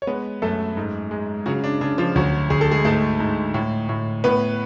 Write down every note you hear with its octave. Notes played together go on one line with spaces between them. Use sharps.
C#5
G#3 B3 B4
F#2 A3 A4
G#2
G#3
C#3 F#3 F#4
D4
C#3 D4
F3 F4
D2 F#3 F#4
D2 G#4
A4
G#3 G#4
G#2 A3 A4
G#2
A2
A2
A2 B3 B4